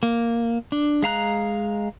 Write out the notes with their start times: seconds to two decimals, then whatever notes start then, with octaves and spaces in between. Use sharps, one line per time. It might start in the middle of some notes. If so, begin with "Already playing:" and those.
0.03 A#3
0.72 D4
1.03 G#3 F5 A#5 F#6